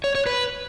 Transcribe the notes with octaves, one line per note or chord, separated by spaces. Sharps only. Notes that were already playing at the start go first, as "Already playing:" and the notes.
C#5
C#5
B4